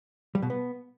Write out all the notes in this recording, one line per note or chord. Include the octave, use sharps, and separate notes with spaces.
G3
B2
B3